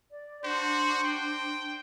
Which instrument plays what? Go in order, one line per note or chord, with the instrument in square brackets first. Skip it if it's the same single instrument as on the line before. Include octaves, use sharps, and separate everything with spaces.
[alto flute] D5
[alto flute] D4 [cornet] F#4 [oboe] C5
[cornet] G5